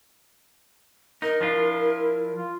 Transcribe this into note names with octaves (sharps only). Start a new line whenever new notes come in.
D#4 A#4
F3 D4 E4 F4
F4